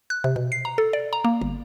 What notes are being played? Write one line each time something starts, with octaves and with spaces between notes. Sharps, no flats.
F#6
C3
B2
C7
A#5
A4
D5
A#5
A#3
G1